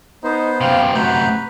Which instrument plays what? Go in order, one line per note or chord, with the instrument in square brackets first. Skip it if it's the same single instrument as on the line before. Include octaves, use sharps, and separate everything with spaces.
[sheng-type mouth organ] B3 C5 [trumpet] D#4
[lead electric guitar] F#2 C3 [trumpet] F5 [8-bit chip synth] G5
[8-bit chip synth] A3 A#5 G6 [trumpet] F#4 [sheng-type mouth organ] B4